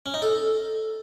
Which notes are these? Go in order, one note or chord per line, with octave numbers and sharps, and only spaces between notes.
C#4
D#4
A4